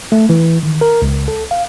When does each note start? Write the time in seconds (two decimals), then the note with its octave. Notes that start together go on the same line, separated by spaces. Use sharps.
0.12 A3
0.29 E3
0.63 D#3
0.81 A#4
1.02 C#2
1.28 A4
1.51 F5